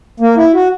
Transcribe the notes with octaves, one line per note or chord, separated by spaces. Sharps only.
A#3
E4
F#4